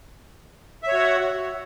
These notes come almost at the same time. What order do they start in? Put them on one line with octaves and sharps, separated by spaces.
E5 C#5 F#4 F#5